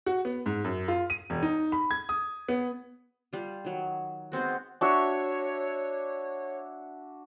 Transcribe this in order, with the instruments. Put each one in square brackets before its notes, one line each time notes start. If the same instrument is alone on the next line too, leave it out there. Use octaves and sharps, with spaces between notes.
[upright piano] F#4
B3
G#2
F#2
F4
D#7
E1
D#4
B5
G#6
D#6
B3
[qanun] G3 F4
D#3 F#3
G#3 B3 C4 F#4
[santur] D4 F#4 E5 [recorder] C#5